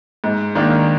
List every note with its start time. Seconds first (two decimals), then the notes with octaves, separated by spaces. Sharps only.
0.24 G#2
0.55 D#3 A#3 D4